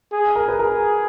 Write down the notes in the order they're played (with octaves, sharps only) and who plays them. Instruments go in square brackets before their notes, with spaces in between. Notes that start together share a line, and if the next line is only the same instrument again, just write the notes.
[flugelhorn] G#4
[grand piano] A#4
B4
[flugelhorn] G#4 [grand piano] A#4